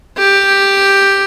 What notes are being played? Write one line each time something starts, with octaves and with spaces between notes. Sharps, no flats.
G4